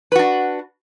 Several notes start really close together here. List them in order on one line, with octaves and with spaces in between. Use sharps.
B4 F#4 D4